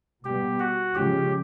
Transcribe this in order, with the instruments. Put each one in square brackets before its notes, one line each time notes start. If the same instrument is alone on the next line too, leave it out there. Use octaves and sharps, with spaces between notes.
[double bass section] B2 G3 B3 [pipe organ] G4
[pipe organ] F#4
[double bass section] C#3 F3 G#3 C#4 [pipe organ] G4